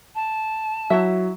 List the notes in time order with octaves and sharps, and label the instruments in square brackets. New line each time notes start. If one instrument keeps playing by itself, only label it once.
[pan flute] A5
[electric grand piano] F#3 [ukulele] E4 F#4 E5